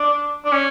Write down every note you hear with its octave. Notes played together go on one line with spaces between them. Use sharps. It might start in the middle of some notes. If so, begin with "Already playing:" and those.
Already playing: D4
D4
C#4